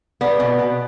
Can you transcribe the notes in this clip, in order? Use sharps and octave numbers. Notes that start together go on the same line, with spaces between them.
B3 D5
B2
B2